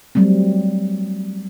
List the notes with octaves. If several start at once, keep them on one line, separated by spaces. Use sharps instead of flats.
F#3 G3 A3 C4